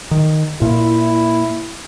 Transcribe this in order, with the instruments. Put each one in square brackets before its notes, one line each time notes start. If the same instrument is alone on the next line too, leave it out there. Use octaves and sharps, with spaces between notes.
[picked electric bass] D#3
[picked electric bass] A#2 [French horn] E4